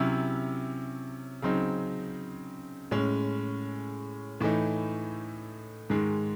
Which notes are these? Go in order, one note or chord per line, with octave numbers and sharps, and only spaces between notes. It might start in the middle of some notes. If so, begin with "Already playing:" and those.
Already playing: C3 F#3 C#4 E4
C#3 F#3 C4 D#4
A2 G#3 C#4
A2 E3 A3 D#4
G#2 D#3 G#3